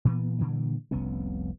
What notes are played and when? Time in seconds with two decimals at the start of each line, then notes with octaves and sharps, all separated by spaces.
0.05 A#2 E3 B3
0.39 A#2 D3 E3 G3
0.91 F1 C2 B3 C#4